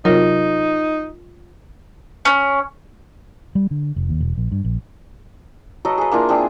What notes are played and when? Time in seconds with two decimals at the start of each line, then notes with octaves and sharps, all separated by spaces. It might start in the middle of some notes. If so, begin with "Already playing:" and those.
0.05 C3 F#3 D#4 F4 A#4
2.25 C#4
3.55 G3
3.71 D3
3.96 F1
4.09 D#2
4.21 E1
4.38 A#1
4.52 G2
4.64 A#1
5.85 F#3 A4 B4 D#5
5.98 G#4 B4
6.12 A#3 D4 E4 F4
6.29 C4 D4 G#4